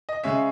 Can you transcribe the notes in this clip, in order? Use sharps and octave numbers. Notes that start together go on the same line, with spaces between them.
D#5
C#3 G#3 C#4 E5